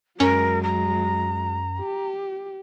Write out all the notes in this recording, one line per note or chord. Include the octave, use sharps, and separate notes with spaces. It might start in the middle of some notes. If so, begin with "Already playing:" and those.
F#2 F#3 G#3 C#4 A#4
A#5
G4